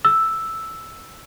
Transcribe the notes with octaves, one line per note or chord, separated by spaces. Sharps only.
E6